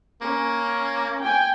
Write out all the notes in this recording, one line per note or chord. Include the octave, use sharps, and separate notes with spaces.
A#3 C#4
G5 G#5